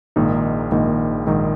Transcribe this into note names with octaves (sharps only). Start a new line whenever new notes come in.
A#1 G#2 D#3 A#3 D#4
A#1 G#2 D#3 A#3 D#4
A#1 G#2 D#3 A#3 D#4